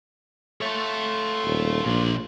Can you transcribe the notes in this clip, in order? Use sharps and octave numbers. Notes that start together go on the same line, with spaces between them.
F4 A4 C#5 E5
D#1
A#1 A#2 D4